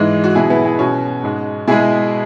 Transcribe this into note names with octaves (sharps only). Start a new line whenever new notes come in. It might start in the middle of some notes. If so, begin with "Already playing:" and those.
Already playing: G#2 E3 G#3
F#4
B2 F#3 E4 G#4
B3 E4
E4 G#4
B2 F#3 C#4 F#4
G#2 G#3
B2 G#3 E4 G#4